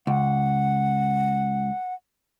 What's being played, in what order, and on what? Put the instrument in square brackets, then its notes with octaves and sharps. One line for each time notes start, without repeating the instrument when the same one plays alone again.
[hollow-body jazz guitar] C#2 [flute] F#5